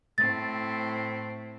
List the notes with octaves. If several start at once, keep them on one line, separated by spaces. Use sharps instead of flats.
A2 C4 A6